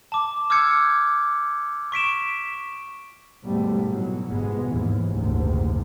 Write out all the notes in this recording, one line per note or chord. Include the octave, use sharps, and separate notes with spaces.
A5 D6
D6 E6 F6 G6 G#6 C#7
C#6 B6 D7 E7
D#2 G#2 B2 G3 A3
B2 E3 F#3
G1 G#2 B2 G#3 B3
D#2 G#2 E3
F#1 D2 G#2 C3 D#3